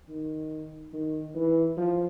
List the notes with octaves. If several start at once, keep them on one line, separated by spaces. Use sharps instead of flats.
D#3
D#3
E3
F3